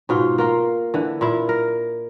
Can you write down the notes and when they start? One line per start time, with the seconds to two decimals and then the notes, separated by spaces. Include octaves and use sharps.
0.09 G#2 B2 F4
0.38 A#3 F4 A#4
0.94 D3 E3
1.21 A#2 E4
1.49 A#4